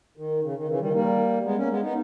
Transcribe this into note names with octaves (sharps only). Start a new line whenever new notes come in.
D#3
C#3
D#3
C#3 E3
D#3 G3
G3 A#3
G#3 B3
A#3 C#4
G#3 B3
B3 D#4